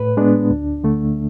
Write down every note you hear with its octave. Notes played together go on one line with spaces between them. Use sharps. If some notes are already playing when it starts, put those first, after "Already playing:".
Already playing: A2 B4
G#3 B3 D4
D2
D3 A3